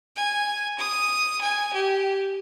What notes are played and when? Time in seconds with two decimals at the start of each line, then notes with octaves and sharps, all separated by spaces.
0.16 G#5
0.79 D#6
1.41 G#5
1.73 G4